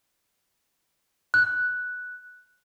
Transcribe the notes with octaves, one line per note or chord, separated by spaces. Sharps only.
F#6